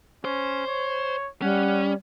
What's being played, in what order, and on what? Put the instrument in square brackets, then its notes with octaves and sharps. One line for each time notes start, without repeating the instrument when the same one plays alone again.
[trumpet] C#4 [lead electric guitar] C5
[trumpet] C#5
[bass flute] G3 [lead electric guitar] C#4 [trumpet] F#5